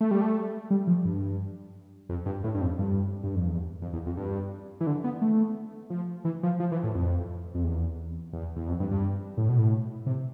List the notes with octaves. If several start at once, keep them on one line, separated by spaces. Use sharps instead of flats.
A3
G3
A3
G3
F3
G2
F2
G2
A2
G2
F2
G2
G2
F2
E2
F2
E2
F2
G2
E3
D3
B3
A3
F3
E3
F3
F3
E3
A2
F2
F2
E2
E2
E2
F2
G2
G2
A2
B2
A2
C3